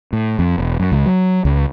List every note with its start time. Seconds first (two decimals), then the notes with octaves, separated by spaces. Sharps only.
0.13 A2
0.39 F2
0.58 E1
0.80 F#2
0.92 C#2
1.06 F#3
1.45 C#2